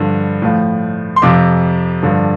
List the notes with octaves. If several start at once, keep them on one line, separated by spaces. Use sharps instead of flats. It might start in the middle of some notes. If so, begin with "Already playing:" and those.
Already playing: G2 D3 F3
A2 F3
C6
F2 C3 F3 D6
G2 D3 F3